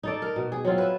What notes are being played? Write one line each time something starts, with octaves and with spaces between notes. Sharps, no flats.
D#4 A4 D5
A#4
B2
G#4
F#3 C4 F4
B4 E5